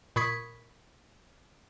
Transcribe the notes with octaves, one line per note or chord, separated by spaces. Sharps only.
A#2 B5 C#6 D#6 G#6 B6